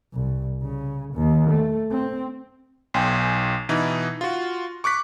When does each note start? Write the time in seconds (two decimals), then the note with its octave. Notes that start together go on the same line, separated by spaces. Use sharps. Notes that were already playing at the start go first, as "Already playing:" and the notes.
0.14 C2
0.62 C#3
1.14 D#2
1.50 A3
1.91 C4
2.94 B1 G5 G#5
3.69 B2 E3 D#4 E4
4.21 F4 F#4
4.84 C#6 D6 F#6 B6